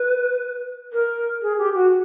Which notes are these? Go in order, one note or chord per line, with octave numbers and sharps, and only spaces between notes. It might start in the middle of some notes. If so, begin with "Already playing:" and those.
Already playing: B4
A#4
G#4
G4
F#4